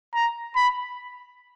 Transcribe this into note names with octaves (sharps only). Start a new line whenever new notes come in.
A#5
B5